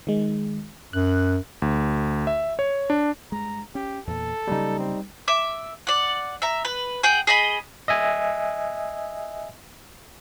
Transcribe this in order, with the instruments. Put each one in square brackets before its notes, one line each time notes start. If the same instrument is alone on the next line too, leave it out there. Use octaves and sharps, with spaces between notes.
[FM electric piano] D#3 G#3
[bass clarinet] F#2 [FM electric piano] F#6
[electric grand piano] D2
E5
C#5
D4
[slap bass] G2 G#3 [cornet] A#5
[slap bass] C#4 [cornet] G4
[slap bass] E2 A#2 [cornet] A4
[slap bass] C#3 F#3 A#3 [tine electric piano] G3 D#4
[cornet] C4
[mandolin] E5 D6
D5 F#5
E5 A#5
B4
G#4 F#5 G5
G#4 D#5 B5
[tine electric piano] D#5 E5 G#5